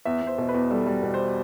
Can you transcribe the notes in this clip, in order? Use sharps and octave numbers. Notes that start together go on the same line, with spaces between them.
E2 E5
E2
C5
B2
B4
E2
G3 A4
G3
B2
C5